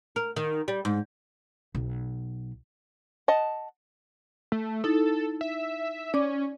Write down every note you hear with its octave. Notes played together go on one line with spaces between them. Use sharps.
A#4
D#3
G3
G#2
B1
D#5 F#5 A5
A3
D#4 E4 A4
E5
C#4 D5 D6